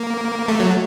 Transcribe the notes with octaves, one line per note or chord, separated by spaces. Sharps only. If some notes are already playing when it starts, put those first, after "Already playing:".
Already playing: A#3
A3
F#3